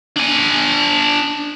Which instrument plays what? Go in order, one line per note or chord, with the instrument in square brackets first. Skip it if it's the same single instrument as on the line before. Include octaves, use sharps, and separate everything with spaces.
[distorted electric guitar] D4 G#5